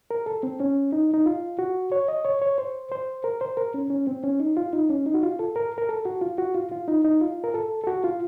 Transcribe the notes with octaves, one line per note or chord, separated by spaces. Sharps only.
A#4
A4
C4
C#4
D#4
D#4
F4
F#4
C#5
D#5
C#5
C#5
C5
C5
A#4
C5
A#4
C#4
C#4
C4
C#4
D#4
F4
D#4
C#4
D#4
F#4
F4
A4
A#4
A#4
A4
F#4
F4
F#4
F4
F4
D#4
D#4
F4
A#4
A4
A4
F#4
F4